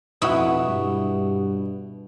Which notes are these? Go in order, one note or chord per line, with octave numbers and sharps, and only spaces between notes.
F2 B2 E4 F#5 C#6 D#6
G2